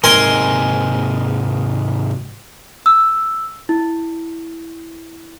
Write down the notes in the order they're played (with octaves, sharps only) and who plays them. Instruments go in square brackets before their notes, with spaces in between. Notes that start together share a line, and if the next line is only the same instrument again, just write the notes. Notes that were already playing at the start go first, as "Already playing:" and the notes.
[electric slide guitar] G#2 C3 D#4 [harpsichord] A#4 G#5 C6
[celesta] E6
E4